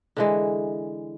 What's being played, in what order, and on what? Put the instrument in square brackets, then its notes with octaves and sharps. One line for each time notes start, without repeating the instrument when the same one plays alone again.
[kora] D3 E3 G#3